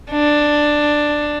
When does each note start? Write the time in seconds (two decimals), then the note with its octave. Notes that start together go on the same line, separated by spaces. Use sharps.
0.12 D4